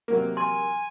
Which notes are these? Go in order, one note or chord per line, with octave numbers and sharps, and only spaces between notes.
C3 F#3 A#3
G#5 C6